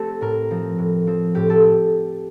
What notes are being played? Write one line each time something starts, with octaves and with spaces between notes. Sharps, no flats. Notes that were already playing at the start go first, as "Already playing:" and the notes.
Already playing: A3 C4 G4 A4
A2 A#4
F3 C4
A2
F3 C4
A2 G4
A4